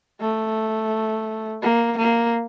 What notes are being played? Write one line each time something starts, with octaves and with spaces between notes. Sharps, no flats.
A3
A#3
A#3